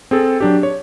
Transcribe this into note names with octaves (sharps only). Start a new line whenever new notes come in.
C4 G#4 A4
F#3 D4 G4
C#5